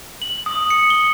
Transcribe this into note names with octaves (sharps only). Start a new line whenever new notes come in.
F#7
D#6
C#7
G7